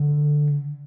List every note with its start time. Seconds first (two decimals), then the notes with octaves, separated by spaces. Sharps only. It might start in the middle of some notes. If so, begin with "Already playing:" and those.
Already playing: D3